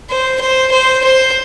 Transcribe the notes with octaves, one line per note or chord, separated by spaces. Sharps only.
C5
C5
C5
C5